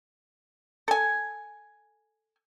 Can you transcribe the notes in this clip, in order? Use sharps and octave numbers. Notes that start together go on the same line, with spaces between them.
A4 G#5